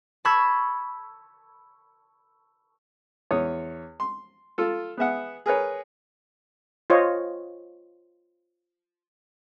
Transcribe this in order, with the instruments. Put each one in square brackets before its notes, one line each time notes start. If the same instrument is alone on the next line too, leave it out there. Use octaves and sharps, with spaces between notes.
[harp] A5 B5 C#6 E6 G#6
[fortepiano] E2 C#5 D#6
C6
F4 A4
B3 G#4 E5 F#5
G#4 A#4 B4 C#5
[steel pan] F4 C5 C#5 D#5